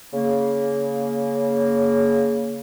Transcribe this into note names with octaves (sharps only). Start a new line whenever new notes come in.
C#3 A#3